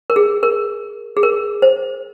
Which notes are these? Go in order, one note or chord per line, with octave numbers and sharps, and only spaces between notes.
A#4
G#4
A#4
G#4
A#4
C5